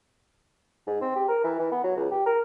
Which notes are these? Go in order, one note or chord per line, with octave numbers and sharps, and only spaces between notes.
G#2
C4
G4
A#4
E3
E3
B3
F#3
C#2
G4
A#4